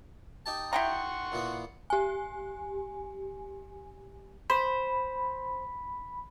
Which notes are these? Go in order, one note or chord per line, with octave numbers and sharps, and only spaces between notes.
D#4 G4 A5
E4 F#5 G5 A#5 C6 C#6
A#2 E3 B3
G4 G#5
C5 B5